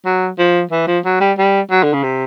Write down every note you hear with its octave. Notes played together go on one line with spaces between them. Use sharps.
F#3
F3
E3
F3
F#3
G3
G3
F#3
D3
C#3
C3